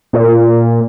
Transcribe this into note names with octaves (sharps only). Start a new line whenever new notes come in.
A#2